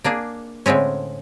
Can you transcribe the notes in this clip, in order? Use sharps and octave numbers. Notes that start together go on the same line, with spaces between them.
A#3 D4 G#4
A2 D3 G#3 C4 C#4